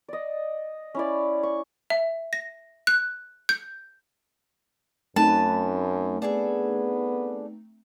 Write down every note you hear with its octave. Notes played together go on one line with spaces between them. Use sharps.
D5 D#5
C#4 E4 D5
C#6
E5
A#6
F#6
G6
F#2 A3 C4 D#4 B4 A5
B3 D4 G#4 A4